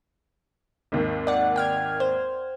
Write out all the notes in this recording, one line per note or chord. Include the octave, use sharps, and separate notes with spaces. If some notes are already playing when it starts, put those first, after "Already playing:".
G#1 D#2
D5 F#5
G5 F6 G#6
C5